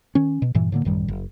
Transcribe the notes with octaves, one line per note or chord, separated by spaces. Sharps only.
D#3 C#4
B2
G2 A#2 E3
A2 D3 A#3
A1 F#2 D#3 G3
F#1